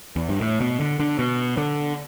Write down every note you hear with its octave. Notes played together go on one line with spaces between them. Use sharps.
E2
G2
A2
B2
D3
D3
B2
D3